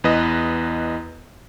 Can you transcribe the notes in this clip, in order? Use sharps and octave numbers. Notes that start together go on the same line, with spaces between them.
E2 B4 D#5